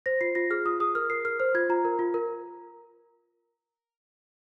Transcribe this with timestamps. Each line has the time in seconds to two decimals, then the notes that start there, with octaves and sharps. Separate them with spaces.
0.06 C5 A#6
0.21 F4 C7
0.35 F4 A#6
0.50 G#4 F6
0.65 F4 D#6
0.80 G#4 D#6
0.95 A#4 F6
1.10 A#4 C7
1.25 A#4 F6
1.40 C5 F6
1.55 F4 G#6
1.69 F4 A#5
1.85 A#4
1.99 F4
2.14 A#4